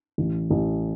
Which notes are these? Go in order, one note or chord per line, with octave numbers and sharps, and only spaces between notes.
A1
A1